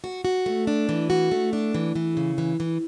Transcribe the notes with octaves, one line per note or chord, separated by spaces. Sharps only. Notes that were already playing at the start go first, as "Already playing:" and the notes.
F#4
F#4
A3
D4
E3
F#4
A3
D4
E3
E3
C#3
E3
E3